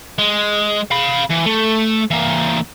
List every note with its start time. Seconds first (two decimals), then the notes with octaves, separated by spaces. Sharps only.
0.19 G#3
0.91 F5 B5
1.30 E3
1.46 A3
2.11 E3 A#3